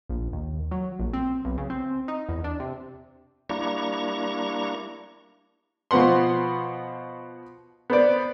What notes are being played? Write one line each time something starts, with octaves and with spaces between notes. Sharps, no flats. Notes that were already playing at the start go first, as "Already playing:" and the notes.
A#1
D#2
F#3
A#1
C4
B1
C#3
C4
D#4
E2
D4
C3
G3 A#3 D4 E4 A#5 C#6
B2 F3 B3 F#5 C6
B3 C5 D5